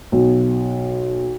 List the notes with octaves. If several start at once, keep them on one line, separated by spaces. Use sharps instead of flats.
B1